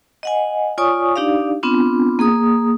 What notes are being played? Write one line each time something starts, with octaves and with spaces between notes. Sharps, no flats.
D#5 F#5 G#5
F4 C#5 D5 G#5 C#6 D#6
D4 D#4 G4 D5 F5
B3 C4 D4 F4
A#3 G#4 D#6